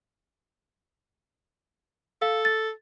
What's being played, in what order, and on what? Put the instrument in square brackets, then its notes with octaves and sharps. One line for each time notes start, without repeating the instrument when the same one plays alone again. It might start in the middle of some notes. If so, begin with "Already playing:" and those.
[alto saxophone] A4 [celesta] F5
[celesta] A6